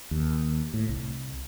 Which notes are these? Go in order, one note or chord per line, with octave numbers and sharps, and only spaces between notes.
D#2
A2
C2